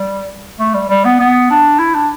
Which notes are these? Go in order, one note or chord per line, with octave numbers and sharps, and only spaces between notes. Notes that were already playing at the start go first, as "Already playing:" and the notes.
Already playing: G3
A3
G3
G3
B3
B3
D4
E4
D4